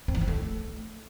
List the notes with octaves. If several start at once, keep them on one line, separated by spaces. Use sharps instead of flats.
C4
E3
C4
A3